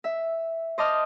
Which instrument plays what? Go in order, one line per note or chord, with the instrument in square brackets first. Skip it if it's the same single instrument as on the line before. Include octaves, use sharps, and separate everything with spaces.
[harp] E5
C5 D#5 A5 D6 F6